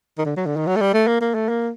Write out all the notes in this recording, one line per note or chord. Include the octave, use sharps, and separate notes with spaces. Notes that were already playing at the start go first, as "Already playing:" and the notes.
D#3
D3
F#3
D3
D#3
F#3
A3
G3
A3
A#3
A#3
A3
A#3